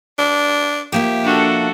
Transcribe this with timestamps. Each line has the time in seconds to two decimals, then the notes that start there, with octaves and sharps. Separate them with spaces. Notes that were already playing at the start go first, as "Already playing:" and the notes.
0.19 D4
0.92 F3 A#3 G4 E5
1.23 D4 F#4 A4